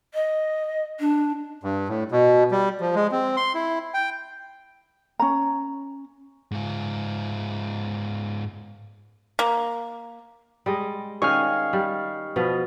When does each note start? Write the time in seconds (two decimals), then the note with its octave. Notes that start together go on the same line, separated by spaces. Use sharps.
0.14 D#5
0.99 D4
1.64 G2
1.89 A2
2.12 B2
2.51 G3
2.80 F3
2.95 G#3
3.12 C4
3.37 C6
3.54 E4
3.94 G5
5.20 C#4 A#5
6.51 G#2 F4
9.39 A#3
10.66 G3 G#3 D#5
11.22 D#3 C#4 G#4 D#5 F5 G#5 C#6 F6
11.73 G3
12.36 B2 F3 B3